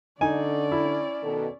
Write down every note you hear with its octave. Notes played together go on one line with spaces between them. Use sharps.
D3 C#4 D#4 D5 G#5
E4
B2 D#3 A4